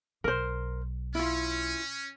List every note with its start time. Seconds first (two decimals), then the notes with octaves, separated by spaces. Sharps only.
0.24 B1 A#4 C5
1.15 C#4 E4 F4